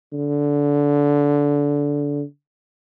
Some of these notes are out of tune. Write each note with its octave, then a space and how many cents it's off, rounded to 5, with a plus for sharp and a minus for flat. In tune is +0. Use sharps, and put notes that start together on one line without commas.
D3 -20